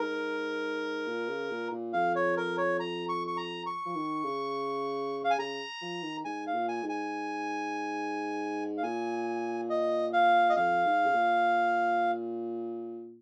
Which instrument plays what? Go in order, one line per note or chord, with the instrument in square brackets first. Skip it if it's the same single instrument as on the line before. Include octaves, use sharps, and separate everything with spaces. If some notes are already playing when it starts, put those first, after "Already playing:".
Already playing: [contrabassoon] G#2 [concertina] A#4
[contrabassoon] A#2
C#3
A#2
A#2
[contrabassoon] F2 [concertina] F5
[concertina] C#5
A#4
C#5
A#5
C#6
C#6
A#5
C#6
[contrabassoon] F3
D#3
C#3
[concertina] F5
G#5
[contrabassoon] C#3 [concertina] A#5
[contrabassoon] F3
D#3
[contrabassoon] G#2 [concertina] G#5
[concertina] F5
[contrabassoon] A#2
[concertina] G#5
[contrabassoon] G#2
[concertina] G#5
F5
[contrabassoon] A#2 [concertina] G#5
[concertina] D#5
F5
D#5
[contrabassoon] F2 [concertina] F5
[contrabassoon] G#2
C#3
A#2